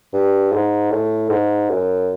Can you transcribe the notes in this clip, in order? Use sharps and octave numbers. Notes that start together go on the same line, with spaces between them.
G2
G#2
A2
G#2
F#2